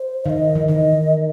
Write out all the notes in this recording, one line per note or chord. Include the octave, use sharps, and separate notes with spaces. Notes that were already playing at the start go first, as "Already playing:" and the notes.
Already playing: C5
D#3 D#5 F5
E3
D#3 D#5